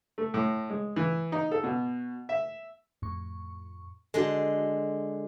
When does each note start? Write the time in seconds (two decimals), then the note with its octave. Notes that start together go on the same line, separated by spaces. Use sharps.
0.18 A3
0.34 A2
0.70 G#3
0.96 E3
1.32 D#4
1.51 A4
1.64 B2
2.29 E5
3.02 F2 A2 C#6
4.14 D3 G#3 F#4 A4